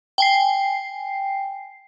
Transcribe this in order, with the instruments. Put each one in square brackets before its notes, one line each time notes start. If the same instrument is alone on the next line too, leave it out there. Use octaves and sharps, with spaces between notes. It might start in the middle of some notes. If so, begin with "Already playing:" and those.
[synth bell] G5 G#5 C7